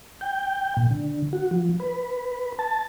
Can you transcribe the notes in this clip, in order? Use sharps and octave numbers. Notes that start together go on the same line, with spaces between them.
G5
A#2
D3
F#4
F3
B4
A5